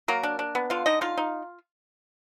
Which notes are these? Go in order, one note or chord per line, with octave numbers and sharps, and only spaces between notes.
F#3 A#3 A#4
D4
D4
B3
D3 F4 F5
D3 D#4 D#5
D#4 F4 F5
D#4